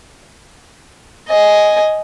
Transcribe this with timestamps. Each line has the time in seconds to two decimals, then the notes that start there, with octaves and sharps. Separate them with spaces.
1.29 D#5 G#5